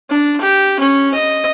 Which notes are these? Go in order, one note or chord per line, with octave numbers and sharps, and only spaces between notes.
D4
G4
C#4
D#5